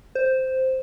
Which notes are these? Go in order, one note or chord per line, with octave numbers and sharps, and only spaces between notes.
C5